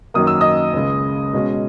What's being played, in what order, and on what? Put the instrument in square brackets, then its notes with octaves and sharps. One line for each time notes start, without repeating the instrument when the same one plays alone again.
[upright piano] F#2 D#3 F#3 A#3 D#6
E6
D#5 D#6
C#2 C#3 G#3
B2 G#3 C#4